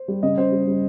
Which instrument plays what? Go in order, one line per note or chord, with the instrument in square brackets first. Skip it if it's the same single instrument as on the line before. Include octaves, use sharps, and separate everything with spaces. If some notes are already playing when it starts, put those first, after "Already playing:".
Already playing: [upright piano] C5
G3
C#3 D#5
C#3 C5
G3
G3